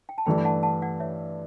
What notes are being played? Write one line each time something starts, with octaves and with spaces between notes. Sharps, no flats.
G5
A5
G2 E3 A3 G5 B5
B5
F#5 A5
F#5 A5
D5 F#5
C#5 E5